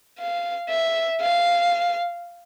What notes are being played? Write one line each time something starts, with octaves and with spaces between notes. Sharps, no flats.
F5
E5
F5